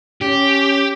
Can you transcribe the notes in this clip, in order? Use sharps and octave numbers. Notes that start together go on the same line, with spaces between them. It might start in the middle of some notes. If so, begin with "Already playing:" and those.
C#4 G4